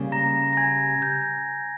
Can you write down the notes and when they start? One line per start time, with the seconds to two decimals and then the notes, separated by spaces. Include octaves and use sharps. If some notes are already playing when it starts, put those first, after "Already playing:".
Already playing: C#3 G3 A#3
0.12 A#5 A#6
0.53 A#6
0.57 G#5 G#6
1.02 G6